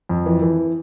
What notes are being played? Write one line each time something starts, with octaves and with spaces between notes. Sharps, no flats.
F2
E3
E3